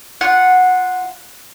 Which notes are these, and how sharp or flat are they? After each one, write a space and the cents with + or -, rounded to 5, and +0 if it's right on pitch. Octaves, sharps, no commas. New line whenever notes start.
F4 +0 F#5 -10